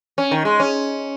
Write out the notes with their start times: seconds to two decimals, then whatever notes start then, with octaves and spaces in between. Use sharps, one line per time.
0.18 C#4
0.31 D#3
0.45 G#3
0.60 C#4